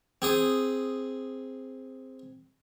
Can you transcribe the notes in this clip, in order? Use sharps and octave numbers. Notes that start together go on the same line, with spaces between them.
C4 G#4 D#6